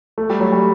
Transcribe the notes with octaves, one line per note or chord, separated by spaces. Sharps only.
A3
G3
F#3
G3